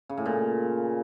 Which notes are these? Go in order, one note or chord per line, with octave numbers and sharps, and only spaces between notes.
C#3
A2
A#2